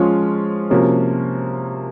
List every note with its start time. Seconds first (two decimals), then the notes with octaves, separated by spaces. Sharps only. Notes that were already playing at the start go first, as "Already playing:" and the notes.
Already playing: F3 G#3 C#4 F4
0.70 C3 F3 A#3 C#4 F#4